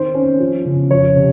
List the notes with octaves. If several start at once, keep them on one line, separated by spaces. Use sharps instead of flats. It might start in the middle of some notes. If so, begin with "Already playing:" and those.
Already playing: D#3 C4 C5
C#4
F3
C#3
F2 C#5
C3